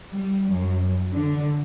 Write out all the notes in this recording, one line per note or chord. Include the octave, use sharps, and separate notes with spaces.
G3
F#2
D3